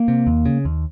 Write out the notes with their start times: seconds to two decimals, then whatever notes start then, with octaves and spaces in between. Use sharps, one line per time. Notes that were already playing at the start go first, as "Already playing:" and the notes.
Already playing: A#3
0.08 C3
0.27 D#2
0.46 C#3
0.65 D#2